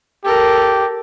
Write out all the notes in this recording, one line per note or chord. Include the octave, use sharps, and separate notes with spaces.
G4 A4 A#4